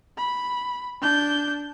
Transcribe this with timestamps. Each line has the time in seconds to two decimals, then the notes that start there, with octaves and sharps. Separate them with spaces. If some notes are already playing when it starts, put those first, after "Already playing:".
0.17 B5
1.01 D4 G6